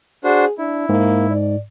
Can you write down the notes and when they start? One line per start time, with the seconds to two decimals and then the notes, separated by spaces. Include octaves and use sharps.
0.24 D4 F#4 G#4 C5
0.58 D4 E4
0.89 G#2 A#3
1.30 D5